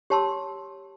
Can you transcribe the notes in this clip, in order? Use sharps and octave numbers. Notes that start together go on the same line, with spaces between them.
G4 C#5 A5 C6 E6